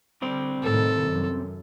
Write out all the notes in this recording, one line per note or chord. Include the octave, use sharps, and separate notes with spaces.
D3 G3 C4 C5
A2 C3 D#3 A4
F#2